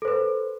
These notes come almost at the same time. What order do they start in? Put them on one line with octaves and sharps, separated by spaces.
A4 C5 B4